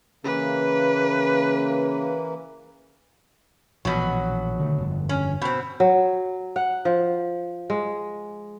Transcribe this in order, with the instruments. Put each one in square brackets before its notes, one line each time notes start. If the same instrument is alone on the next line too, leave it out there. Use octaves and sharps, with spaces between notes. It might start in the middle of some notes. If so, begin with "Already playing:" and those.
[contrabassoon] C#3 [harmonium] E3 A#3 [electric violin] B4
[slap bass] A#1 E3 [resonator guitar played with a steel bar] B2 F#3
[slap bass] D3 D#3 A3
G1 F2
[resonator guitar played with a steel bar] C#4
B2 C4
[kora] F#3
F#5
F3
G#3